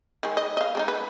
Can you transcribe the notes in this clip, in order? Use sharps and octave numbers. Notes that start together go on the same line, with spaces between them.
D#3 G#3
D#5
D#5 F5
G#3 D4 D#4
B4